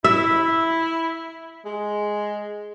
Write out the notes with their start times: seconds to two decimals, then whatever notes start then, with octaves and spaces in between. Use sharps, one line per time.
0.04 E4 E5
1.66 G#3